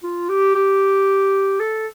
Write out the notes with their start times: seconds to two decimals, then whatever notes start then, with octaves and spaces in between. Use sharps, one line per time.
0.03 F4
0.29 G4
0.55 G4
1.60 A4